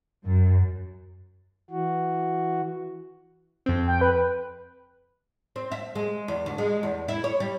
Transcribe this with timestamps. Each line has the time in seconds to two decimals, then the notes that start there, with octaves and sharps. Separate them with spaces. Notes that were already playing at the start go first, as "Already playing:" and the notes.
0.25 F#2
1.70 E3 F#4
3.66 F2 C4
3.88 G5
4.01 B4
5.56 C4
5.72 E5
5.95 G#3
6.28 E2
6.46 D2
6.58 G#3
6.83 E2
7.08 E4
7.24 C#5
7.40 G3